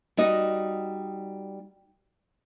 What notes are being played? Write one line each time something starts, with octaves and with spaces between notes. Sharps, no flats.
G3 D#4 F#4 D#5